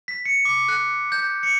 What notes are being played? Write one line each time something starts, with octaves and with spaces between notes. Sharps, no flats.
B6
C#7
D6
F#6
G6
C#7